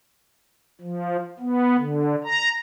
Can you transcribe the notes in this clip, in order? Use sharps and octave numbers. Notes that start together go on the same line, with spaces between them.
F3
B3
D3
A#5